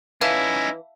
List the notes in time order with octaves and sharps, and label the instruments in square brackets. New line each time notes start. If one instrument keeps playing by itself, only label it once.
[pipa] E3 [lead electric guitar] C#4 D#4 [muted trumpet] E4 [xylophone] E5 F5 A5